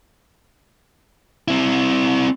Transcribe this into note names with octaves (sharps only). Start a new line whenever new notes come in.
C4 E4